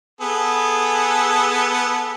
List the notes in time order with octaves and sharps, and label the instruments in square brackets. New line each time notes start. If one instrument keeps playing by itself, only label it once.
[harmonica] B3 G#4 A4